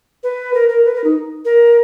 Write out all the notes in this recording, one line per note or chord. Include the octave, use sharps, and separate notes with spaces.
B4
A#4
A#4
B4
A#4
D#4
A#4